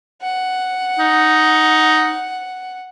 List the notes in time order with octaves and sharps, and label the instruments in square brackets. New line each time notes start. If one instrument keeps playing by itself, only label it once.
[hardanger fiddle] F#5
[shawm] D#4